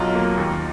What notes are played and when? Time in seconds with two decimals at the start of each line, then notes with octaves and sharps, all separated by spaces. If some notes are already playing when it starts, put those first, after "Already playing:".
Already playing: B1 F#3 F4
0.15 A#3
0.37 D#2